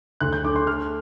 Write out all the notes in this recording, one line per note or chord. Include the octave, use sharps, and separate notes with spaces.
D2 F#6
G6
D3 D6
C6
A3 F6